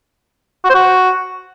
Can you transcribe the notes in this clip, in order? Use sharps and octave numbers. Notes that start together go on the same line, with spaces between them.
F#4
C5
F#4